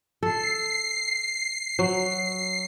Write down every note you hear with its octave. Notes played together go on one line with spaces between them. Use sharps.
A4 C7
F#3